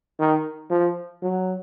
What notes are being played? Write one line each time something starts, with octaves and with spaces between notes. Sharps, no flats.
D#3
F3
F#3